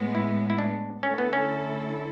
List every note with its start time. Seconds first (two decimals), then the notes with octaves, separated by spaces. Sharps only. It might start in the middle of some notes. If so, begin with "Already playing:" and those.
Already playing: A2 G#3 B3
0.15 E4
0.50 E4
0.58 D4
1.03 D3 A3 C#4 E4 A4
1.18 B3
1.33 C#4